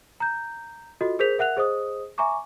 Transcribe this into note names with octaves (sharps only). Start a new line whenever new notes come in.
A#5 G6
F4 F#4 A4 D#5
G#4 A#4 C5 G6 B6 F7
A#4 E5 F#5 F#6 F7
G#4 C5 D#5 D#6
E5 G#5 A#5 C#6 D6